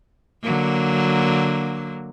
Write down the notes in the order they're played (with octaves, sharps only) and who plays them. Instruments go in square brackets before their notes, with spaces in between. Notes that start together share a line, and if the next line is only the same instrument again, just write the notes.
[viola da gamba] D3 F#3 A#3